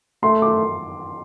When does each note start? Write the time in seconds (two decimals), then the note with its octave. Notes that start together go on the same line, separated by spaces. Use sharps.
0.23 A3 C6
0.42 D6